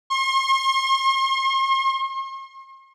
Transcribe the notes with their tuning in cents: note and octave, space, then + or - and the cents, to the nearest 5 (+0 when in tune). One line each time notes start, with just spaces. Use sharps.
C6 +45